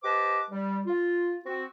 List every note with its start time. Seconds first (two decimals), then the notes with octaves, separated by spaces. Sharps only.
0.03 G4 B4 C5 D#5 A5 D6
0.49 G3
0.86 F4
1.44 C4 F#4